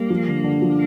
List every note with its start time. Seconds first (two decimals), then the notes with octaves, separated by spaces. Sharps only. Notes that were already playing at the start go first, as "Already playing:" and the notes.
Already playing: G3 A#3
0.10 F3
0.28 D3
0.44 D3
0.62 F3